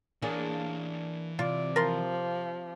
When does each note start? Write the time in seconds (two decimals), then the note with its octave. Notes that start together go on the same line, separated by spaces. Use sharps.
0.22 E3 A#3 D4 G#4 C#5
1.39 C3 F4 D5
1.76 F3 A#4 D5 C6